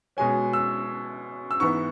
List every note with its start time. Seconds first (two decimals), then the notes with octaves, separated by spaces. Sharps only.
0.17 B2 G#3 C#4 G#5
0.53 E6
1.51 E6
1.60 G#2 E3 B3 C#6